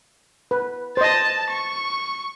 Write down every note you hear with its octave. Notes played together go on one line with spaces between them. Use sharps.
B4
C5 D#5 A5 A6
C#6